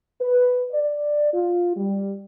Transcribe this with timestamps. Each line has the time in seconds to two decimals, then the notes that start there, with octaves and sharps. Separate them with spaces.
0.21 B4
0.72 D5
1.34 F4
1.76 G3